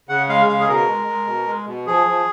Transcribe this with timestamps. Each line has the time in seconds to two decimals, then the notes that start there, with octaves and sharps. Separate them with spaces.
0.09 C#3 F#5
0.29 G#3 F5
0.48 C#3 F5
0.60 G#4
0.68 B2 A#4
0.88 G#3
1.08 G#3
1.27 B2
1.47 G#3
1.67 B2
1.86 F3 G#4
2.06 F3